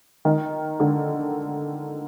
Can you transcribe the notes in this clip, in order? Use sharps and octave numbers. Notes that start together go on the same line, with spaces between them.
D#3
D3